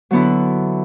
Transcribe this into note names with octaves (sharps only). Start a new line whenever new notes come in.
D3 F#3 B3 E4